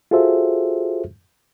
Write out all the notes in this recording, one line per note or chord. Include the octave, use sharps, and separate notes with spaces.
F4 F#4 G#4 A4 C5 E5